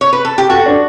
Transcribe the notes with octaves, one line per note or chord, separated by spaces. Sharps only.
C#5
B4
A4
G4
F#4 A4
D4